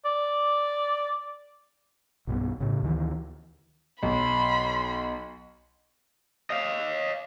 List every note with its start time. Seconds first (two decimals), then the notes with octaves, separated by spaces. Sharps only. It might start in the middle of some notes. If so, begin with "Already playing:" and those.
0.05 D5
2.27 B1 G2 F#3 B3
2.61 A2 C#3
2.83 D2 D#3 E3
4.03 B1 B5 C6
6.50 D#5 F5